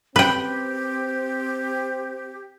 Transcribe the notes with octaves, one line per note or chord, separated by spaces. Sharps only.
C4 G4 B4 G5